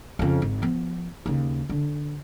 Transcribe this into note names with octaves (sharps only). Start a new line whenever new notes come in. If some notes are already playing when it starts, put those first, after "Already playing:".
F2 C#3
G#1
F3 B3
D#2 C#3
D3